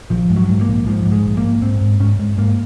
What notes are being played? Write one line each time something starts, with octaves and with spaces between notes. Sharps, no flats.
A#1 F3
G#2
F#3
G#2
A#3
A#1
G#2 F3
G#2
G#3
A#1
A#3
G#2
G#2 C4
G#2
G#2 C#4
G#2
G#2 A#3